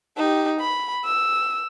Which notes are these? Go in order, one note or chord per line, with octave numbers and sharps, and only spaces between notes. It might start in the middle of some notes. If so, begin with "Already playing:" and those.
D#4 G4
B5
E6